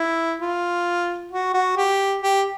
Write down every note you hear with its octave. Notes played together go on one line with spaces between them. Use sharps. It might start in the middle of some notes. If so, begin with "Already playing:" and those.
Already playing: E4
F4
F#4
F#4
G4
G4